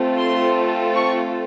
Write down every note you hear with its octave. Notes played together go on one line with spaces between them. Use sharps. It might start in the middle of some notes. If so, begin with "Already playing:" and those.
Already playing: A3 C4 F4 A4
C6
C#6